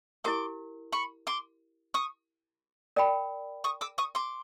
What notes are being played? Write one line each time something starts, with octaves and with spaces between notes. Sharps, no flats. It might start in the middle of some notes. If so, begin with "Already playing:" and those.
E4 G4 A#4 C6 D6
B5 C#6
C6 D6
C#6 D#6
A#4 D5 G5 B5
C#6 D#6
D6 E6
C#6 D#6
C6 D6